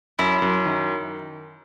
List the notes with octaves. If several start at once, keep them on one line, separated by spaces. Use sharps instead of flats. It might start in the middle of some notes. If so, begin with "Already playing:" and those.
F#2 E4
F#2
D#3